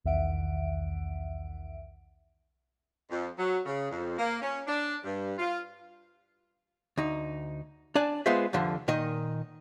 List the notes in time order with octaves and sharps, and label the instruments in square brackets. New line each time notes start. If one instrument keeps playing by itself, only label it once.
[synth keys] B1 E2 D#3 E5 F#5 D7
[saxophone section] F2
F#3
C#3
F2
A#3
C#4
D4
G2
F4
[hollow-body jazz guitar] D2 D#4
D4 D5 G#5 A5
G#3 B3 F4 G#4 C5 E5
C2 F2 D3 F3
A#2 D#3 D#5